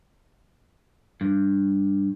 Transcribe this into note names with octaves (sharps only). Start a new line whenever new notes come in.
G2